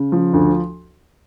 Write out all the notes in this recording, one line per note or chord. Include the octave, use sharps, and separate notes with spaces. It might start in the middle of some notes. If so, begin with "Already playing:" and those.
Already playing: C#3
F3
D2